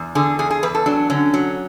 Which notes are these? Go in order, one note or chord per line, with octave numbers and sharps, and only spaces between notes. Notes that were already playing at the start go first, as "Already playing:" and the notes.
Already playing: E2
D3 G#4
E2 G#4
G#4
E2 B4
A4
F#3 D4
D3 C#4
F#3